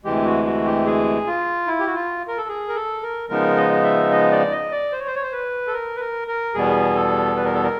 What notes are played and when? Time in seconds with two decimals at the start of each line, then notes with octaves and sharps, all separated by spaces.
0.05 D2 C3 E3 G#3 G4
0.25 F#4
0.45 F#4
0.65 G4
0.86 G#4
1.26 F4
1.67 E4
1.80 G4
1.87 F#4
1.94 F4
2.28 A#4
2.38 A4
2.49 G#4
2.69 A#4
2.75 A4
3.03 A#4
3.30 C#3 F3 G#3 B3 D#4 A#4
3.57 D#5
3.72 D#5
3.84 E5
4.11 D#5
4.31 D5
4.51 D#5
4.72 D5
4.92 C5
5.00 C#5
5.07 C5
5.15 C#5
5.23 C5
5.32 B4
5.67 A4
5.73 A#4
5.96 B4
6.00 A#4
6.28 A#4
6.54 E2 B2 G3 B3 G#4
6.95 A4
7.36 B4
7.45 A#4
7.54 A4
7.63 A#4